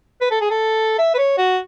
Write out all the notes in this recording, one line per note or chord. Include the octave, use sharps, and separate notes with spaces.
B4
A4
G#4
A4
E5
B4
C#5
F#4